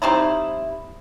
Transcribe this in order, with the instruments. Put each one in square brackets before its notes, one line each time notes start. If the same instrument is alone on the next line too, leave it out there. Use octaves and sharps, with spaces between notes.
[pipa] G3 C4 D#4 E4